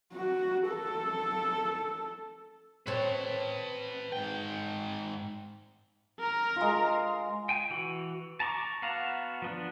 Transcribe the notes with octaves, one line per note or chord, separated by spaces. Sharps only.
F#4
A4
C4 B4 C#5 A5
G#2 G5
A#4 A#5
G#3 F4
G5 G#5
E3 F#4
A5 A#5 C#6 D6
B3 F#4 F5 A5 A#5
F3 B3 D4